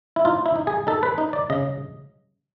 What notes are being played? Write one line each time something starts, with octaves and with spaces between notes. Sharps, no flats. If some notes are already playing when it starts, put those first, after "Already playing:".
E4
D#4 F4
E4
D#4
G#4
D#4 A4
B4
D#4
D5
C#3 D#5